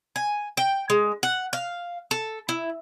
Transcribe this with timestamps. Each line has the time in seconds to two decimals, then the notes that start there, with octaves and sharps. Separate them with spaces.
0.16 G#5
0.57 G5
0.90 G#3
1.23 F#5
1.53 F5
2.11 A4
2.49 E4